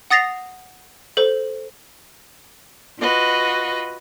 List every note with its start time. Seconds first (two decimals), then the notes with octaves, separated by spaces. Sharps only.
0.10 F#5 D#6 A6 A#6 C7 F7
1.17 A4 C5
2.99 F4 F#4 B4 D#5